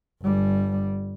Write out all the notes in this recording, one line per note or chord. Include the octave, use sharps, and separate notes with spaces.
G1 G3